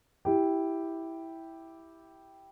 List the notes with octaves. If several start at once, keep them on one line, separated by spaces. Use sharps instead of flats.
E4 G4